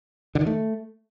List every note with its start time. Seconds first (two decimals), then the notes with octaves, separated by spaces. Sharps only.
0.35 D3
0.41 D#3
0.47 A3